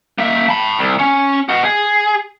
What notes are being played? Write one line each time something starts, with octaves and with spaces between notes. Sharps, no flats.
A#3 E5
A5 B5
C2
C#4
B2 F#4
G#4